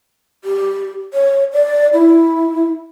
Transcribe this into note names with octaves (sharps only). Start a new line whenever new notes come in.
G4
C#5
D5
E4